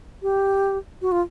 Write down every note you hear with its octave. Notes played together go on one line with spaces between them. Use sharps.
G4
F#4
F4